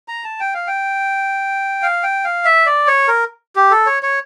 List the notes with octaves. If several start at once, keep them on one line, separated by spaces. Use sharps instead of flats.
A#5
A5
G5
F5
G5
F5
G5
F5
E5
D5
C#5
A#4
G4
A4
C#5
C#5